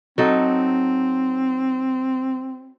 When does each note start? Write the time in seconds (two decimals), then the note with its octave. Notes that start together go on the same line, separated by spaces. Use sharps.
0.18 F#3 C4 D#4 A4